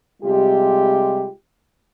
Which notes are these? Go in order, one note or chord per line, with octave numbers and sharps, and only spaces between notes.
C3 G3 G#3 F4 G4